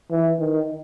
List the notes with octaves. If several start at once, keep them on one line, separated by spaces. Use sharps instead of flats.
E3
D#3